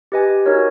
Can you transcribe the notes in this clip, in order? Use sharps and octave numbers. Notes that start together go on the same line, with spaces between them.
G4 B4 D#5 G#5
D#4 F#4 A#4 C#5